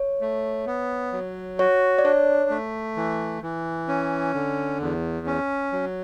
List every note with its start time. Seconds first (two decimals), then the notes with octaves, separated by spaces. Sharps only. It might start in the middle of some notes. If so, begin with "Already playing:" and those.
Already playing: C#5
0.21 A3
0.67 B3
1.13 F#3
1.59 F#4 C#5
1.98 D5
2.05 D4 C#5
2.50 A3
2.96 E3
3.42 E3
3.88 C#4
4.34 D3
4.80 E2
5.26 C#4
5.72 F#3